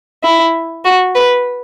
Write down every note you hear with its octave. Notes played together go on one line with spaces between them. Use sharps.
E4
F#4
B4